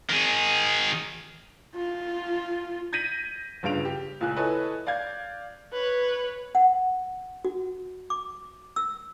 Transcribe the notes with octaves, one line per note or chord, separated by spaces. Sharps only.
D#3 G#4
F4
G6 G#6 A#6 B6 D#7 F#7
G1 G2 C#3 F4 D7 F7
G4
C#2 A#2 G#5 F#6
E4 A4 B4 C#5 D#5 G#5
D5 F5 G6 G#6
B4 C#5
F#5
F#4
D6
E6